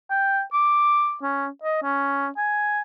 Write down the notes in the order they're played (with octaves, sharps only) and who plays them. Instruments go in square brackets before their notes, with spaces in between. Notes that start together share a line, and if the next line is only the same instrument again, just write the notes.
[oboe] G5
D6
C#4
D#5
C#4
G#5